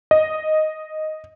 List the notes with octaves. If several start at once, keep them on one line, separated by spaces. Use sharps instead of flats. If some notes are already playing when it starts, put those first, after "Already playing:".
D#5